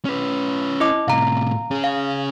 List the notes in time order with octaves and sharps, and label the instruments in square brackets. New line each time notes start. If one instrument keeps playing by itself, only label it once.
[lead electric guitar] C#4 B4
[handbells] E4 D#5 D6
[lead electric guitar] A2 C3 [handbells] F5 A#5
[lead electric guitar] C#4 G#4
[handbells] F5